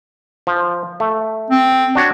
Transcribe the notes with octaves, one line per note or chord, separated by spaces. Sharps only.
F3
A3
C4
D4 F#4 C#5